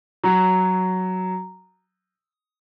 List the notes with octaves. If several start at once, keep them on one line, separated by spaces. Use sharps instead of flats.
F#3